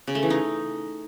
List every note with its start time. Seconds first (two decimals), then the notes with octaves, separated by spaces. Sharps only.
0.07 C#3
0.15 A3
0.23 E3
0.30 D#4